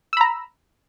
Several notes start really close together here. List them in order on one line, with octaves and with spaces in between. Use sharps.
E6 B5 A#5